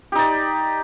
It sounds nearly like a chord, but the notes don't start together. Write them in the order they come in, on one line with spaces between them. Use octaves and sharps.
G4 D#4 D5